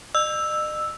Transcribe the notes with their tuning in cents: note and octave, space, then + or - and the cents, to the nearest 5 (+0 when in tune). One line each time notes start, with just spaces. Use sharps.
D#5 -40 E6 +0